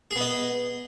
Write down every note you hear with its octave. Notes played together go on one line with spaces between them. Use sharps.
B3 G#4 D#5